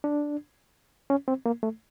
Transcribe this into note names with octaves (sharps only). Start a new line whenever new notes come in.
D4
C#4
C4
A#3
A3